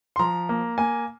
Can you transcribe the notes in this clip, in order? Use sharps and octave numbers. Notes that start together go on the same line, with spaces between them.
C6
F3 A#5
A#3
A#3 G#5